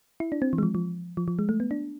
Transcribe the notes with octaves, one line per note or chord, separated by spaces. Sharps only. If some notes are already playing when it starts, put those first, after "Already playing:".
E4
D4
C4
E3
G#3
F3
F3
F3
F3
G#3
A3
B3
D4